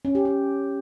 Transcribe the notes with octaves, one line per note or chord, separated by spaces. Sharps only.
C#4
G4
G4